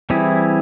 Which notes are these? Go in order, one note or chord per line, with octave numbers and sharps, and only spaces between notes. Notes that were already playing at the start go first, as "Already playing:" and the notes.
E3 G3 C4 E4 G#4